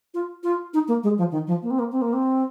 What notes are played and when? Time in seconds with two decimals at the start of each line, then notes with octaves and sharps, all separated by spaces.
0.14 F4
0.43 F4
0.74 D#4
0.88 A#3
1.03 G#3
1.18 F3
1.32 D#3
1.47 F3
1.63 A#3
1.71 C4
1.79 A#3
1.92 C4
2.02 A#3
2.13 C4